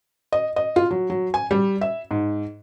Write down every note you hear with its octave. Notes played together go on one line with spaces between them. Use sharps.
D#5
D#5
F4
F#3
F#3
G#5
G3
E5
G#2